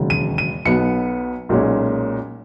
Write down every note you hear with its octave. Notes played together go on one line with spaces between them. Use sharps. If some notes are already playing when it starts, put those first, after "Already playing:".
Already playing: E1 D#2 C#3 F#3
D#7
D#7
B1 B2 F#3 B3 C#7
B1 A#2 G#3 C#4